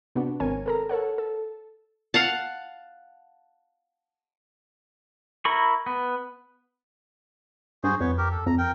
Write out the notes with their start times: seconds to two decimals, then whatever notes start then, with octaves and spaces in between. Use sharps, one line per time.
0.15 C3 B3 D4 F#4
0.40 G#1 D#3 C4 A#4 C#5 G#5
0.66 A4 A#4 A#5
0.89 A4 A#4 C#5 F#5
1.18 A4
2.14 F5 F#5 A5
5.45 E4 A#4 B5 C#6
5.86 B3
7.84 G2 F#4 G#4 C5
8.00 F2 B3 C#5
8.18 G4 A#4
8.31 A4
8.46 F2 A#5
8.58 A#4 G5